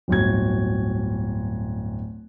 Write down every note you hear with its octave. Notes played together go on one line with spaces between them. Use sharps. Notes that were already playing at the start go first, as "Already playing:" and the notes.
D1 G1 F#4 G#6